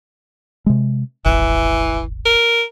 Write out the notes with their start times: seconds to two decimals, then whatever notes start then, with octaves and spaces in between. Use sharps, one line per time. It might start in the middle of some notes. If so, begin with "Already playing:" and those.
0.66 C3 G#3
1.25 D#1 G#1 E3
2.26 A#4